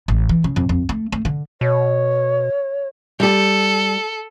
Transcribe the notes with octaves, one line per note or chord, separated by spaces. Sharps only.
A1
E3
C#3
F2
F2
A3
A3
D3
B2 C#5
G3 G4 A4